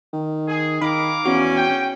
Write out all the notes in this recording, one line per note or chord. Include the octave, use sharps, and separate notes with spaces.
D#3
G#4
D#3 A#4 F5 B5 D6
E2 C#4 F#4
G5